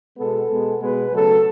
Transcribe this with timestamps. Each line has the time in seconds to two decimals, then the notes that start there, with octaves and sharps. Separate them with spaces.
0.18 B2 G#3 B3 A4
0.49 B2 G#3 B3
0.81 B2 G#3 B3 B4
1.12 C#3 F#3 A3 A4